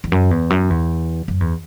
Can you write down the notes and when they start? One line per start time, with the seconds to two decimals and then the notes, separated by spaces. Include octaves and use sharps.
0.04 E2
0.12 F#2
0.31 E2
0.50 F#2
0.70 E2
1.28 F#2
1.41 E2